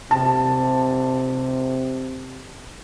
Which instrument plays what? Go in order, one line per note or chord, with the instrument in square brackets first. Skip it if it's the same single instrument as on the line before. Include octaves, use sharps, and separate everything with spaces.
[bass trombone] C3 [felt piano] A5